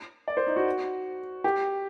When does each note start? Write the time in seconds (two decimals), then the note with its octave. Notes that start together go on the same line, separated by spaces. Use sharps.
0.28 D5
0.37 C5
0.47 D#4
0.56 F#4
1.44 G4